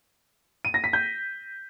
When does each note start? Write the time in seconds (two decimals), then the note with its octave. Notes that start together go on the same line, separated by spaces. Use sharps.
0.65 D#7
0.74 A#6
0.84 B6
0.93 G6